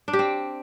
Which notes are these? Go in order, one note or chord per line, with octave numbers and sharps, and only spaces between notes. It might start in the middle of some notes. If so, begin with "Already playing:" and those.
D4
G4
C4